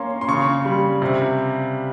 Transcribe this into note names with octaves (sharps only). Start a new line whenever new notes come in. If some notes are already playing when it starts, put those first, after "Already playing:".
Already playing: A#3 C#4 C6
C6
C#3 C#6
G3
C3